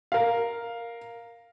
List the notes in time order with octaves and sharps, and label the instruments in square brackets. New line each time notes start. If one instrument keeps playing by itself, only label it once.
[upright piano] A#4 F5